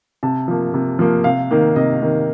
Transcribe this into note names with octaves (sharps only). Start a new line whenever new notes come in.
C3 A5
F3 A#3
C3
F3 A#3
C3 F5
D#3 A#3
C3 D#5
D#3 A#3